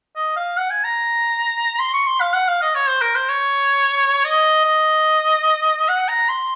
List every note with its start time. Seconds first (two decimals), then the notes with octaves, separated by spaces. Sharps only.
0.16 D#5
0.36 F5
0.57 F#5
0.70 G#5
0.84 A#5
1.79 C6
1.93 C#6
2.07 C6
2.21 F5
2.34 F#5
2.48 F5
2.62 D#5
2.75 C#5
2.88 C5
3.02 A#4
3.16 C5
3.29 C#5
4.25 D#5
4.65 D#5
5.89 F#5
6.08 A#5
6.29 C6